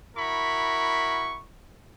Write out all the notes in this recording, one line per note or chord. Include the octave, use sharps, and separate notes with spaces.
E4 F#4 A#4 B5 C#6